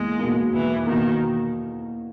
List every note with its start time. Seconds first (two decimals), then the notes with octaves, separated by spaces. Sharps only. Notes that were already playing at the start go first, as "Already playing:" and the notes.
Already playing: E2 G#3 A#3
0.19 B2 A#3
0.53 E2 E3
0.87 B2 D#3 A#3